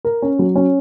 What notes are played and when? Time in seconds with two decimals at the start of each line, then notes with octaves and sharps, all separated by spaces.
0.05 A#4
0.22 C#4
0.39 F#3
0.56 C#4